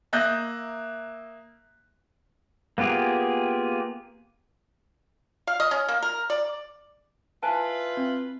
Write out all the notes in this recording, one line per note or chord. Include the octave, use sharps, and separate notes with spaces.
A#3 E5 D#6 F#6 G6 A#6
A#3 B3 F4 G4 G#4
F5
D#5
C#4
A#3
A#4
D5
E4 F4 B4 C5 G#5 A5
C4